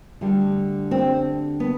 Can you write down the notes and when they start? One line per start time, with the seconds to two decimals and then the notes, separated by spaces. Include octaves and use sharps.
0.21 D2 D3 G3
0.91 C4
1.60 B3